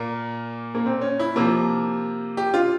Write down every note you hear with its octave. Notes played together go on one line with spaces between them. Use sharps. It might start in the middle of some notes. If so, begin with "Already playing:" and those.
Already playing: A#2 A#3
A#3
C4
C#4
E4
C3 F3 A#3
G4
F4